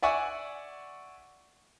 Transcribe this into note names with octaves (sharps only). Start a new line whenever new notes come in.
D5 E5 F#5 G#5 C#6